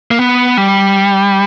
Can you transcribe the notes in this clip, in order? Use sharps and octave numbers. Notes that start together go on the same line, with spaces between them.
A#3
B3
G3